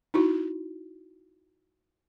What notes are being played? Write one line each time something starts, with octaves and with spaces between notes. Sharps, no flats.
D#4 E4 F#4